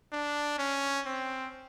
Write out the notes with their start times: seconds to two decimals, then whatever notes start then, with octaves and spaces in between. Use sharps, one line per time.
0.12 D4
0.58 C#4
1.06 C4